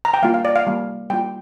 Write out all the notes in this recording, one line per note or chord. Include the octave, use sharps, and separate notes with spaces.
A#5
G5
G3 A#3 F4 F5
F5
D5
F5
G3 A#3 F4
G3 A#3 F4 G5